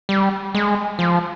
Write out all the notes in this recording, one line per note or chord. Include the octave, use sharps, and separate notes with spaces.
G3
G#3
F3